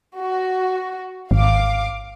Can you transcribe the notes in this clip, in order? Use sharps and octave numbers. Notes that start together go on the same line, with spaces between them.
F#4
G#1 F5 D6